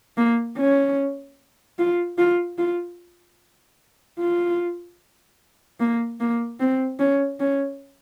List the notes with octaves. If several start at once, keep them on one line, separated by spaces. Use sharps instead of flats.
A#3
C#4
F4
F4
F4
F4
A#3
A#3
C4
C#4
C#4